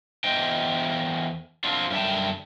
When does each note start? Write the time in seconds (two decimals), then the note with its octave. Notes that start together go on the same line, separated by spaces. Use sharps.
0.24 E2 C5 D#5 G5
1.64 F3 F#3 C4 D4 F4
1.91 F#2 D3 G3 E5 G5 A5